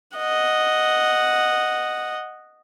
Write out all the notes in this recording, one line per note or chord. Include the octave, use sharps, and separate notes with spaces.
D#5 F#5